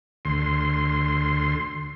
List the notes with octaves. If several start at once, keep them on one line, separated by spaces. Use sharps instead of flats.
D2 C6